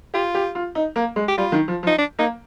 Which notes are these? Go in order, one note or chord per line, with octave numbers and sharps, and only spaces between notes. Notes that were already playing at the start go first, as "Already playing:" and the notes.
F4 G4
G4
F4
D#4
A#3
G#3
G4
G3 F4
D#3
F3
F3
D#4
D4
A#3 D#4